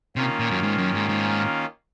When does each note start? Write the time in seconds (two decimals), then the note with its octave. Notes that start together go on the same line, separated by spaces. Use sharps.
0.16 C3 D#3 A#3 C#4 F4
0.39 A#2
0.51 F#2
0.63 G#2
0.78 F#2
0.95 G#2
1.09 G#2